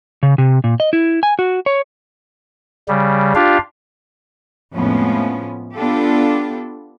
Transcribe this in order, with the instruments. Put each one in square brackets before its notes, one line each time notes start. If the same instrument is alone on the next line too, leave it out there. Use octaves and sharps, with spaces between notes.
[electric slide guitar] C#3
C3
A#2
D#5
E4
G#5
F#4
C#5
[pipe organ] C#3 G3
D4 F4 G4 F5
[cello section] F2 A2 F3 G#3 B3 C#4
B3 D4 F4 G4 A4